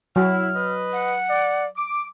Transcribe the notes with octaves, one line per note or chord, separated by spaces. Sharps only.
F#3 E4 F#4 F6
B4 D#5
F#5
D5
D6